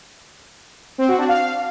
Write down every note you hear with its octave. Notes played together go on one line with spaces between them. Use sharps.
C4
F#4
D4
F5